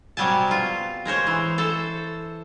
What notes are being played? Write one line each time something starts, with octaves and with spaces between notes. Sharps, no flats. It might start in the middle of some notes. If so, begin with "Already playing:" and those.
C3 F#3 G3 G#5 A5
B2 F4
G#3 A#4 C5 C#5
E3
A4 C5